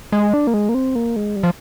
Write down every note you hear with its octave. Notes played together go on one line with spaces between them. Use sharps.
G#3
D4
A#3
G#3
A#3
C4
A#3
G#3
G3
F3